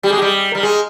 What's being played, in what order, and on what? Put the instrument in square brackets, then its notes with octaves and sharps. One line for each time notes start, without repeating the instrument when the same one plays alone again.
[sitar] G3 [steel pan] G4
[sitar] G#3 [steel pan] G#4
[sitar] G3 [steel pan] G4
[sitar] G3 [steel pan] A#4
[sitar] G#3 [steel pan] G#4